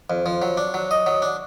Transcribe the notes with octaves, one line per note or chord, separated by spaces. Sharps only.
F2
F3
F#3
D4
F#3
D#5
F#3
D4